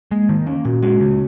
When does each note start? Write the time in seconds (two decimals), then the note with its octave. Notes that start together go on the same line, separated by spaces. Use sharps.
0.11 G#3 A#3
0.29 D#3
0.47 A#3 C#4
0.65 A#2 F#4
0.83 G#3 F#4
1.00 C#3